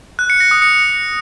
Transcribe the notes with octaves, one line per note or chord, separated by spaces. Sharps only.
F#6
C#7
A#6
D#6
C#7